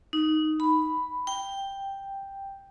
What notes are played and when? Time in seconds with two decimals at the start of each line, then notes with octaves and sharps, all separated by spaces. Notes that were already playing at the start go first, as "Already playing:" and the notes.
0.13 D#4
0.60 B5
1.27 G5